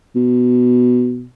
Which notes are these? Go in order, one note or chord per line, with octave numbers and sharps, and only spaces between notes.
B2